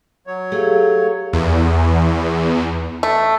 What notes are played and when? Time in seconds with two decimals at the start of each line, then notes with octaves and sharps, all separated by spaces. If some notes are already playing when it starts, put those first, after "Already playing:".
0.27 F#3 C#5
0.52 A3 G4 G#4 F5
1.33 E2
3.03 A3